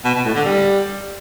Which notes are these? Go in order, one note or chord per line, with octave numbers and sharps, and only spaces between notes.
B2
B2
A2
D3
G3